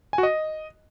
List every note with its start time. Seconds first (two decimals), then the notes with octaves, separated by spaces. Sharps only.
0.13 G#5
0.18 F#4
0.23 D#5